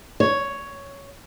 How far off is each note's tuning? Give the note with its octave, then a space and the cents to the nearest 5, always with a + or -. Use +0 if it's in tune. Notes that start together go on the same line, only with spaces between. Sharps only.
C#5 +5